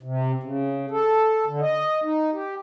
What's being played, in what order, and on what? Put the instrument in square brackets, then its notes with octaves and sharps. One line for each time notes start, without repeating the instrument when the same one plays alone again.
[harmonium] C3
C#3
A4
D3
D#5
D#4
G4